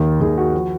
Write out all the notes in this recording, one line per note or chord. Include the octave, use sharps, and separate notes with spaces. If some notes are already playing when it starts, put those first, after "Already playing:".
Already playing: D#2 D#3 A#4
D#2 D#3 G#4
F#4
F3